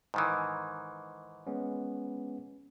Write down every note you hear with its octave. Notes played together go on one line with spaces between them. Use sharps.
G#2 D#3 E3
G#3 B3 C#4